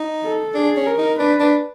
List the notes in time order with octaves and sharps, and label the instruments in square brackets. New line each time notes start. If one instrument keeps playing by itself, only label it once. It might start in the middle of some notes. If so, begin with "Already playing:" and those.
Already playing: [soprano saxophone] D#4
[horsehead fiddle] A4
[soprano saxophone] D4 [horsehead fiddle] G#4
[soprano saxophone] C#4
[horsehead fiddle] A#4
[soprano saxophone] D#4
[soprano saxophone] D4 [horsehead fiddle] B4
[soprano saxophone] D4